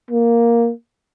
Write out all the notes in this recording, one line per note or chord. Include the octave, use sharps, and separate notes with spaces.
A#3